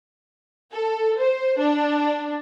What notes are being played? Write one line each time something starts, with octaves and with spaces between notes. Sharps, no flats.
A4
C5
D4